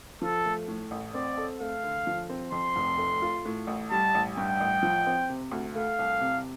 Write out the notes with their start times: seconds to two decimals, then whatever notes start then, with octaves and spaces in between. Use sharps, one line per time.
0.22 F3 A4
0.46 A3
0.68 A2
0.91 A1
1.14 C4 D5
1.38 A4
1.60 A3 F5
1.84 D3
2.07 F3
2.30 C4
2.52 F2 C6
2.76 F1
2.98 A3
3.22 F4
3.45 A2
3.67 A1
3.91 G3 A5
4.14 A1
4.36 G2 G5
4.60 A1
4.83 F3
5.07 C4
5.30 C3
5.51 D2
5.75 A3 F5
5.99 C2
6.21 C3